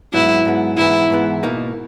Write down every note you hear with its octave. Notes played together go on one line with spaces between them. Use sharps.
G#2 F#3 B3 E4
G#2 F#3 B3
G#2 E3 B3 E4
G#2 E3 B3
B2 A#3 D#4